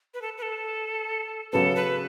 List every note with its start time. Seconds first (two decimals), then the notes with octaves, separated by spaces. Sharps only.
0.14 B4
0.22 A4
0.38 B4
0.42 A4
1.52 C#3 F#3 B3 A4
1.76 B4